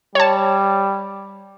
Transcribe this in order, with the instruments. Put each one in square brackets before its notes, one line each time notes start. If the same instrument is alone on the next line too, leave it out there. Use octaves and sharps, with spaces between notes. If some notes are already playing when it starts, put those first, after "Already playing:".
[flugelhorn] G3 [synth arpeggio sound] C#5 A5